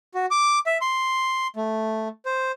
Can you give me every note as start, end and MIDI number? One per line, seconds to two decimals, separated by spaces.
0.14 0.26 66
0.31 0.59 86
0.66 0.78 76
0.81 1.47 84
1.56 2.08 57
2.25 2.52 72